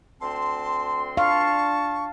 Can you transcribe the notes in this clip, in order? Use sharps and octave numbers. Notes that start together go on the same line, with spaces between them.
D2 C4 A5 C6
D4 F5 A5 C#6